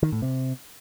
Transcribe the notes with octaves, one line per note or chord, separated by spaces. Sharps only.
D#3
A2
C3